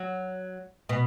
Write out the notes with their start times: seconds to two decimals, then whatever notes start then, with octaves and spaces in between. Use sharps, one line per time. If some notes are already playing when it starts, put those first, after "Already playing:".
Already playing: F#3
0.89 B2